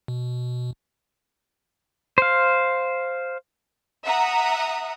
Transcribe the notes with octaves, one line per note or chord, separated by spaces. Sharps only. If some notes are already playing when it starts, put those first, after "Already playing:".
B2
C5 F5
E5 F#5 A#5 D#6